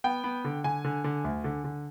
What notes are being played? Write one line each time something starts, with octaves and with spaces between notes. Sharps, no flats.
B3 G5
B3
D3
D3 G#5
D3
D3
D2
D3
D3